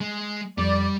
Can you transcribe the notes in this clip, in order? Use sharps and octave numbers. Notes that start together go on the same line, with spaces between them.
G#3
F2 G3 D5